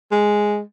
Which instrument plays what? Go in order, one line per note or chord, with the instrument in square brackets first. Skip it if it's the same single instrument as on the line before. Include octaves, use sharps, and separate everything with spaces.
[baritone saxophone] G#3